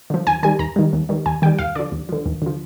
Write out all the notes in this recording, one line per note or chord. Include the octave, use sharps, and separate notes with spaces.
D3 F3
D#2 G#5
D#3 G3 G#5
D#2 A#5
D#3 G3
D#2
D#3 G3
D#2 G#5
D#3 G3 G5
D#2 F5
D3 F3 D5
D#2
D3 F3
D#2
D3 F3